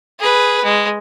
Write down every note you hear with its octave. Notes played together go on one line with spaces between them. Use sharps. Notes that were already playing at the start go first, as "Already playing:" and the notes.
G#4 B4
G#3